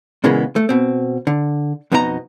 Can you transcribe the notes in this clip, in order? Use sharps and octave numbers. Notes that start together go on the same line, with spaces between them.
A#2 C#3 E3 G#3 A#3 B3
A3
B2 C4
D3
F2 B2 B3 D#4 E4 A#5